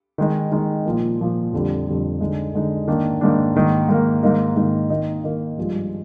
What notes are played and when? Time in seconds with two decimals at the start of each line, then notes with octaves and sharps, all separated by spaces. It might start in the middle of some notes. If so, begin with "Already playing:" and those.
0.18 D#3 G#3 D#4
0.52 D#3 G#3 D#4
0.85 A#2 F3 A#3
1.19 A#2 F3 A#3
1.53 F2 D3 G3
1.87 F2 D3 G3
2.20 D3 G#3 D#4
2.54 D3 G#3 D#4
2.88 G#2 D#3 A#3 D4
3.21 G#2 D#3 A#3 D4
3.56 G#2 D#3 A#3
3.88 G#2 D#3 A#3
4.23 G#2 D#3 A#3 D#4
4.56 G#2 D#3 A#3 D#4
4.90 D#3 A#3 D#4
5.24 D#3 A#3 D#4
5.58 G2 F3 G#3